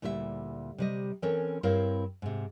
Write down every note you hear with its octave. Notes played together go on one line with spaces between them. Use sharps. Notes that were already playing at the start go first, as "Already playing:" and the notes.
D2 A#2 G3 E4 F4 E5
C3 G3 D#5
E3 C4 C#4 A4 A#4 C#5
G2 C4 E4 A#4 C#5 F5
G#2 C3